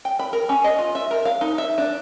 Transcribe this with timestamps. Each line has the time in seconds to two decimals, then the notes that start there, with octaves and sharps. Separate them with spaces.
0.05 G5
0.19 B5
0.33 A#4
0.49 C#4
0.64 D#5
0.79 F4
0.95 E5
1.11 A#4
1.25 F5
1.41 D#4
1.58 E5
1.78 D4